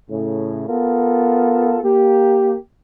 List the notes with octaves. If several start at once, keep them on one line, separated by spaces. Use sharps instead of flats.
A2 C#3
B3 F4 A4 A#4
A#3 G4